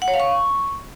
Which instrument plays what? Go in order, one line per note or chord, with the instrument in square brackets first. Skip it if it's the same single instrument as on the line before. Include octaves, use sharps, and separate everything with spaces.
[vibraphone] F#5
C#5
F5
C#6